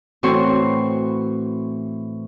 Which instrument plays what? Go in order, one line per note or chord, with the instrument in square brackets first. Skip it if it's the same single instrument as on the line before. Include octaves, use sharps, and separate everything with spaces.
[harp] A2 E3 C4 F#4 C6 C#6